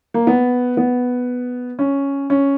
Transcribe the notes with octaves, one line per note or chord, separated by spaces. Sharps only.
A#3
B3
B3
C#4
C#4